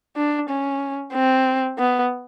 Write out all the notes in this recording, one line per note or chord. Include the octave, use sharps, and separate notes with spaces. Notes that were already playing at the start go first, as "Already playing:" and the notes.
D4
C#4
C4
B3